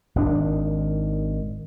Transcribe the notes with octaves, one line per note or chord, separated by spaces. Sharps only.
G#1 D#3 D4